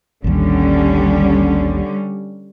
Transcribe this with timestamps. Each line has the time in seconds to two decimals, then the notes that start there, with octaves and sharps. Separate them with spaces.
0.24 A1 D#2 D3 G3 C#4